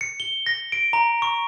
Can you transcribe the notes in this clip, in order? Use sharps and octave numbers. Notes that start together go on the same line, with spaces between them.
C#7
G7
A#6
D7
A#5
C#6